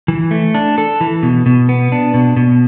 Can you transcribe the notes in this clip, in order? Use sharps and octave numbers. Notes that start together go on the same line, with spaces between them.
E3
A3
D4
A4
E3
B2
B2
B3
D4
B2
B2